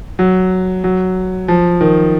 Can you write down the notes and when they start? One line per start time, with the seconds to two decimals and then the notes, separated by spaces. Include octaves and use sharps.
0.19 F#3
0.84 F#3
1.48 F3
1.81 D#3